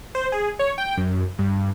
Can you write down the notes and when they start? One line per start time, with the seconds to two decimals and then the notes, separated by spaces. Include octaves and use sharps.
0.15 C5
0.32 G#4
0.59 C#5
0.78 G5
0.97 F#2
1.39 G2